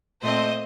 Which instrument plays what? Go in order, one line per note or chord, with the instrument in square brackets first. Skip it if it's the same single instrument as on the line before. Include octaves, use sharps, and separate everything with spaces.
[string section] A#2 A3 C4 C5 D#5